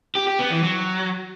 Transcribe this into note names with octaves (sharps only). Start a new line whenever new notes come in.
G4
G4
B3
E3
F#3